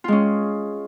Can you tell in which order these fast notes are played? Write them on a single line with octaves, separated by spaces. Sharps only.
F4 G#3 C#4